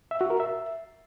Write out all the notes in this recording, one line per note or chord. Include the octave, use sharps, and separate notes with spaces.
E5
F#4
A#4
E5